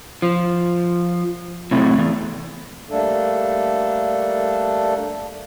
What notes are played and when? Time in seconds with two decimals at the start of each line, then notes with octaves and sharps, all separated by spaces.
0.22 F3
1.71 A2 C3 F#3
1.99 E2
2.90 G3 A3 A#3 D4 A4